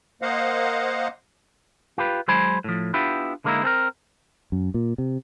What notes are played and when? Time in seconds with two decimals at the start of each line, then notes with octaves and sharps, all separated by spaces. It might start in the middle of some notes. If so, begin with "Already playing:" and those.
0.22 A#3 C5 D#5 F5 F#5
1.98 F4 G4 B4
2.28 F#3 G#3 C5 G#5 B5
2.64 A2 F3
2.94 B3 D4 E4 F4 G4
3.44 D3 G#3 A#3 C#4 D#4 E4
3.64 C4 A4 A#4
4.52 F#2
4.74 A#2
4.98 C3